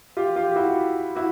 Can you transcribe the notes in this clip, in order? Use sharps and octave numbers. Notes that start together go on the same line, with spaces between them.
F4 G4
F4 G4
G4
E4 F#4
E4 F#4